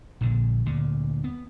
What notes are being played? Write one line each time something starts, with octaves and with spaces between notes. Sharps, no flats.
A#1 A#2 D3
D2 A#2 D3
B3